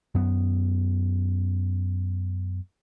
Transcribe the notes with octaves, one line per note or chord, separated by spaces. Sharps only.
F#2 B3